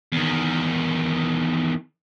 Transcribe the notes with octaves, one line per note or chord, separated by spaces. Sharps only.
E2 D#3